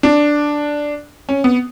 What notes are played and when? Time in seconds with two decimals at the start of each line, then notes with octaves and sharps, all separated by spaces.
0.03 D4
1.29 C#4
1.44 B3